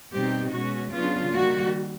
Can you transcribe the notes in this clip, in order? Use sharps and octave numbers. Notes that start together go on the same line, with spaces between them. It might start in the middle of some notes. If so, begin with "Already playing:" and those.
B2 G3 C4 D#4 G4
B2 G#3 C#4 F#4
C#3 F#3 B3 D4 F4
D#3 G3 A#3 F#4